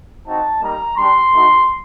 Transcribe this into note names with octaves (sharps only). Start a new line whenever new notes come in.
C4 D#4 F#4 A5
G3 A#3 D#4 A#5
G3 D4 G4 C6
A3 D#4 F#4